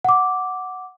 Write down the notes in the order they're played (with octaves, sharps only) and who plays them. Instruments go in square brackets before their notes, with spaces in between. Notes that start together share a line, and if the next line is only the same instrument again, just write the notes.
[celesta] F#5 D6